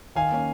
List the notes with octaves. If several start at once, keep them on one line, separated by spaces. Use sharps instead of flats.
D#3 F5 G#5
A#3 C#4